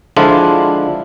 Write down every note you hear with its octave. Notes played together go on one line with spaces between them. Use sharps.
D3 F3 G#3 D4 E4 F4